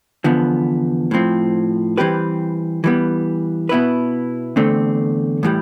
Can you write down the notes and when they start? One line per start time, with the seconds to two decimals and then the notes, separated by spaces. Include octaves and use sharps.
0.24 E2 D3 F3 B3
1.11 A2 F3 C4
1.98 E3 G3 C4 G4 B4
2.84 E3 G3 B3
3.69 B2 B3 E4 B4
4.56 E2 D3 A3 C4
5.43 A2 E3 G3